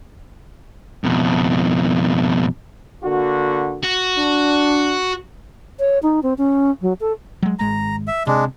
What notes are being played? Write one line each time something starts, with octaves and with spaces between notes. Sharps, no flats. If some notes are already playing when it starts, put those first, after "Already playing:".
F2 B2
D3 A#3 F#4
F#4
D4
C#5
D#4
C4
C#4
F#3
A4
F#3 G#3
G#1 G#3 A#5
E5
C3 G#3 D4